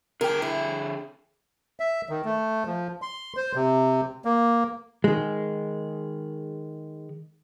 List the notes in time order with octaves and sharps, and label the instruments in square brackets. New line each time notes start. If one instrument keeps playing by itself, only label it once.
[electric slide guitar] D3 G#4 G5 [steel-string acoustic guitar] A#4
[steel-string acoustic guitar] E4
[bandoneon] E5
D#3
A3
F3
C6
C5
C3
A#3
[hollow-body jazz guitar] D#3 G#3